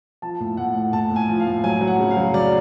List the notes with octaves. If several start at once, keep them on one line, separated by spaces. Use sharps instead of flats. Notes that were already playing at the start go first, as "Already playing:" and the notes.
F3 A5
A2
A2 F#5
A2
A2 A5
A2
G#5
F3
F5
A2
F#3 G#5
F#3
F#5
C#3
F5
F#3
F#3 D5